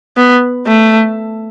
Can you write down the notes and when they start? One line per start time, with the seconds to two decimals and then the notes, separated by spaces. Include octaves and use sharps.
0.17 B3
0.66 A3